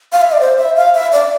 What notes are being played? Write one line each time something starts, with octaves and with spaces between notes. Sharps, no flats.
F5
E5
D5
C5
E5
F5
E5
D5